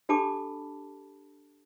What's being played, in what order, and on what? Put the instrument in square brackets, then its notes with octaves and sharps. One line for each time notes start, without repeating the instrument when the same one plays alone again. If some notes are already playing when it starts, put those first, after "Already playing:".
[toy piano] D4 G4 A4 A5 B5 D6